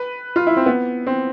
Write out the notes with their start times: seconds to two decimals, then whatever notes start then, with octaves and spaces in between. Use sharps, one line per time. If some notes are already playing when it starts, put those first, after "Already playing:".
Already playing: B4
0.36 F4
0.47 E4
0.57 C4
0.66 B3
1.07 C4